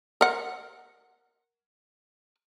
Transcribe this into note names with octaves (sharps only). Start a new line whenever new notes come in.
A#4 F#5